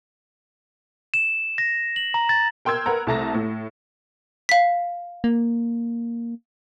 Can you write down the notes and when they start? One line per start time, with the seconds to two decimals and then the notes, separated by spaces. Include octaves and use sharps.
1.14 E7
1.58 A#6
1.96 F#7
2.14 A#5
2.29 A6
2.65 A#4 G5 C6 E6 G#6
2.86 A#4 B4 F#5 A#5
3.07 C2 A3 A5 A#5 A#6
3.34 A2
4.49 F5 B6
5.24 A#3